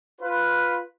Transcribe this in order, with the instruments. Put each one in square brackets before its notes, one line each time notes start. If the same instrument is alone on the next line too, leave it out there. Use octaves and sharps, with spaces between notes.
[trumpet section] F4 B4